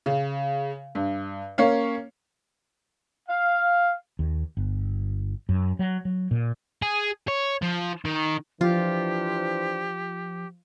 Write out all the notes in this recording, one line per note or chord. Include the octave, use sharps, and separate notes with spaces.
C#3
G2
A#3 C#4 C#5 F5
F5
D#2
G1
F#2
F#3
F#3
A#2
G#4
C#5
F3
D#3
E3 F3 D4 F4 G4 C5